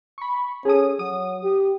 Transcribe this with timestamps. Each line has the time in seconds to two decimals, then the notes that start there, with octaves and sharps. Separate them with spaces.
0.18 B5 C#6
0.65 C#4 G#4 A4 D#6
0.99 F#3 D#6
1.43 G4